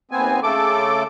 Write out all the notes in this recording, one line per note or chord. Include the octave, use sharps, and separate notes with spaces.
D#2 B3 C4 G#5
C#3 A3 A4 D6